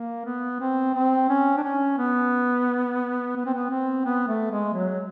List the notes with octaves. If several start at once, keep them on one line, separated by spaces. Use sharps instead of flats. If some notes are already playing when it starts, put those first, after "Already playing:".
Already playing: A#3
B3
C4
C4
C#4
D4
C#4
B3
B3
C4
B3
C4
B3
A3
G#3
F#3